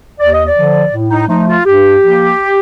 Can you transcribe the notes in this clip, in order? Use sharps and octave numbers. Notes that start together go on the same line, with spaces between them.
D#2 D5
D#5
D5
D3 F3
A2
D#4
F3 A3 D#4
F4
G2 G4
F3 A#3